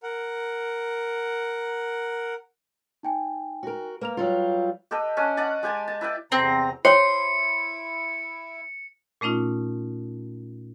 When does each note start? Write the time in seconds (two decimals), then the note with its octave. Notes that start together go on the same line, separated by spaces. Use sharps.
0.03 A#4 F#5
3.03 D#4 G5 G#5
3.63 F#4 A#4
4.01 A#3 B4 A#5 F7
4.17 F#3 G3 F4
4.91 G4 A4 B4 D#5
5.17 C#4 D4 D#5 G#5
5.37 D5 D#5 F#5 A5
5.63 G#3 G4 G#5 A5
5.88 A5
6.01 E4 B4 D5 G5
6.32 E2 C3 C4 A#5
6.85 E4 C5 C#5 C6 C#7
9.21 A#2 A3 C#4 D#4 F4